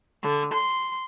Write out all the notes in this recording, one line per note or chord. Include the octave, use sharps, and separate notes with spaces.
D3
C6